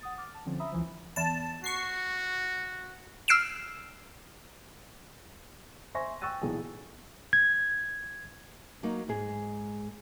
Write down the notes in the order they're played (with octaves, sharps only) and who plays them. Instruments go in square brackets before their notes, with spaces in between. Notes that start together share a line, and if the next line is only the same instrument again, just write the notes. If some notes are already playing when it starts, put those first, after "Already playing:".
[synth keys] F#5 D#6 A6
D6 F6 A6
A5
D3 F3 C4 C#4
E5 A#5 B5 D#6 E6
C#2 E3 F3
[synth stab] E2 A5
[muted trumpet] F#4 [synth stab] C#6 C7
[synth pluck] E6 F6 C7 D7 E7
[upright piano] C5 E5 G#5 C6 C#6 A#6
G5 C#6 E6 F#6 A6 D#7
B1 A#2 E3 G#4
[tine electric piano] G#6
[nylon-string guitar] F#3 A#3 D#4
G#2 G#3 G#4